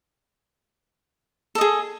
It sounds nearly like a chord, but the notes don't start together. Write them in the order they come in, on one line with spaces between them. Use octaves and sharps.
A4 D#5 G#4